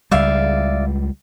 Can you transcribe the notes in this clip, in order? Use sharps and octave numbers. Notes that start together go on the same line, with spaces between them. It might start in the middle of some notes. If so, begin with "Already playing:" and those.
C#2 G3 D5 E5 F5